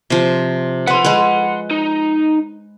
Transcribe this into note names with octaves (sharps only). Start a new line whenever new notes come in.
C3 F3
B4 F#5 C6
G#3 B4
D#4